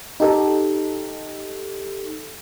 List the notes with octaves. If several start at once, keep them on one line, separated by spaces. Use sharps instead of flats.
D#4 G4 A4